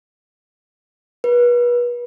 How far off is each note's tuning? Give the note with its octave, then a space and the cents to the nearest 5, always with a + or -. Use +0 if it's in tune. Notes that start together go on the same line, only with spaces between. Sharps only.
B4 -35